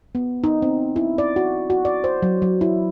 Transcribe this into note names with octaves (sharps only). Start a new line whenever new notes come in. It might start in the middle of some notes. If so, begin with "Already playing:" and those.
B3
D#4
C4
E4
D5
F#4
F#4
D5
C5
F#3
F#3
E4